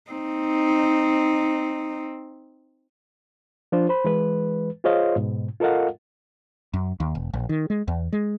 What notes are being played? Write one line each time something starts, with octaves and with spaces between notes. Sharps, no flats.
C4 D#4
F3 D4 F4 C5
C5 B5
E3 G#3 B4
F4 G#4 C5 C#5 D#5 F5
G#2 B2
F4 A4 A#4 D#5 F5 F#5
F#2
D#2
E1
A#1
D#3
G#3
E2
G#3